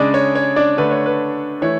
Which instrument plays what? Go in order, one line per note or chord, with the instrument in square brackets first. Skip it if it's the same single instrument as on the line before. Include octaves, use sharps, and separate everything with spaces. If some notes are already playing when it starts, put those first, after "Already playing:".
Already playing: [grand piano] C#3 G#3 D4 D5
C#5
C#5
D4 D5
D3 A3 D4 B4
C#5
B4
E3 A3 E4 C#5